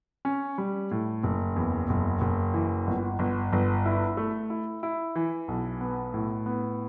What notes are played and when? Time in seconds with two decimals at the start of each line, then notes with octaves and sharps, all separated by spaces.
0.25 C#4
0.58 G3
0.91 A2
1.23 F#1
1.56 E2
1.89 F#1
2.21 F#1
2.54 E3
2.87 G1
3.19 G1
3.52 G1
3.85 E4
4.17 A3
4.50 E4
4.83 E4
5.16 E3
5.48 B1
5.81 B3
6.14 A2
6.46 B3